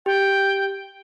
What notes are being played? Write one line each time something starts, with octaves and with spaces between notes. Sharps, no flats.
G4 G5